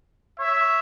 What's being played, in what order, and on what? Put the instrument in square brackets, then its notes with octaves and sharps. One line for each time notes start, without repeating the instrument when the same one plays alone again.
[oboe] C#5 [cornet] E5